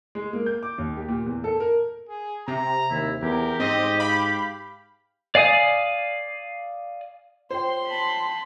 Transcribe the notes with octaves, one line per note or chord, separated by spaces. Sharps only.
G#3
A#3
G6
D6
D#2
G4
A#2
E2
A4
A#4
G#4
C3 A#5
D#2 E4
E2 G4 A#4
G#2 C4 D#5
F5 B5
D5 F5 G#5 D#6
F4 C5 C#5 G5 C6
A5 B5